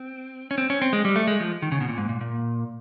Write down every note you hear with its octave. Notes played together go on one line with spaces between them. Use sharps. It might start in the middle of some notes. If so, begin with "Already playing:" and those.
Already playing: C4
C#4
C4
C#4
C4
G#3
G3
A3
G#3
F3
D#3
C#3
B2
A#2
G#2
A#2
A#2